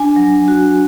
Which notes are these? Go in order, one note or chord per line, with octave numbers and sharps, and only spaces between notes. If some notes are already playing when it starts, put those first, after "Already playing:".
Already playing: D4 G#5
F#3
F#4